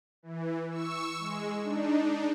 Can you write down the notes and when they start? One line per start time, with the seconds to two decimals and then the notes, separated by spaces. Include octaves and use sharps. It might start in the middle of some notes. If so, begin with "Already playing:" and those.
0.23 E3
0.70 C#6 E6
1.19 G#3
1.64 D4 D#4